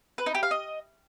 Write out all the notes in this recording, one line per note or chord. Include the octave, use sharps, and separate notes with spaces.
B4
D#4
G4
F5
D#5